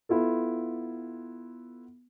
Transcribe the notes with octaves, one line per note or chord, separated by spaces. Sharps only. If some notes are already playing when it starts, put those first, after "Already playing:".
B3 E4 F4 A4